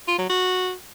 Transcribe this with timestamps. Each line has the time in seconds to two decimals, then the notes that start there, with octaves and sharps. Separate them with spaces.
0.08 F4
0.19 F#3
0.29 F#4